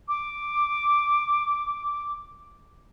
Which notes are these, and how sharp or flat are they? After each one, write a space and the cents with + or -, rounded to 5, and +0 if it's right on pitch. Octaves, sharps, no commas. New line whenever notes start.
D6 +0